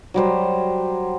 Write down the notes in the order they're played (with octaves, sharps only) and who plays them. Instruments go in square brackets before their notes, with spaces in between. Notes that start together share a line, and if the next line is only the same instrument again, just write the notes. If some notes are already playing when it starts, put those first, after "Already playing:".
[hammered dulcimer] F#3 G3 C5